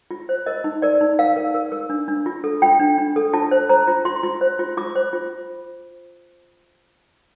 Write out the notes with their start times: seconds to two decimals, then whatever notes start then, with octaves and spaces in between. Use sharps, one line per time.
0.11 F4
0.29 C5
0.46 A#4 D#5
0.64 D#4
0.82 A#4 D5
1.01 D#4
1.19 A#4 F5
1.37 A#4
1.55 A#4
1.72 A#4
1.90 D4
2.08 D4
2.26 F4
2.44 A4
2.62 F4 G5
2.80 D4
2.98 D4
3.16 A4
3.33 F4 A5
3.51 C5
3.69 C5 A#5
3.87 F4
4.05 F4 C6
4.23 F4
4.41 C5
4.59 F4
4.77 F4 D6
4.96 C5
5.13 F4